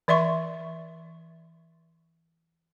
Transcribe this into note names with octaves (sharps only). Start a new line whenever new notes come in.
E3 D5 E5 C6 C#6